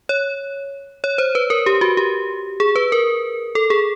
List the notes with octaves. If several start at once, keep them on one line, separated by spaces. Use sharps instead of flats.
C#5
C#5
C5
B4
A#4
G4
F#4
G4
G#4
B4
A#4
A4
G#4